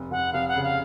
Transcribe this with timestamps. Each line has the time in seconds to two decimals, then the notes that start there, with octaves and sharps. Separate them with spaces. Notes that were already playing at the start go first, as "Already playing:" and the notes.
Already playing: F1
0.11 F1 F#5
0.33 F1 F5
0.48 F#5
0.56 C#3
0.64 F5